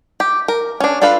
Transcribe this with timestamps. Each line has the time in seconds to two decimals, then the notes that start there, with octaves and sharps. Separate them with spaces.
0.20 G4
0.48 A#4
0.80 C#4 D4
1.02 D4 F4 A4 B4 F5